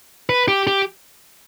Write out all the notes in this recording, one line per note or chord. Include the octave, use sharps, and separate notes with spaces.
B4
G4
G4